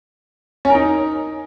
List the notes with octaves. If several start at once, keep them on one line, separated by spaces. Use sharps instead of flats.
C#4
A#4
D#4